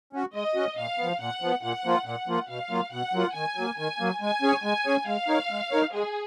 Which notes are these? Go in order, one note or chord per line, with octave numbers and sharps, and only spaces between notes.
C#4 F#4
G#3 D#5
C#4 F#4
A#2 F5
F3 B3
A#2 F#5
F3 B3
A#2 F#5
F3 A#3 F4
A#2 F#5
F3 A#3 F4
B2 F5
F#3 A#3 F4
B2 F#5
F#3 A#3 F4
D#3 G#5
F#3 A#3
D#3 G#5
F#3 A#3
G#3 G#5
C#4 G#4 C#5
G#3 G#5
C#4 G#4 C#5
G#3 F5
D#4 A#4 C#5
G#3
D#4 A#4 C#5
G#3 G#4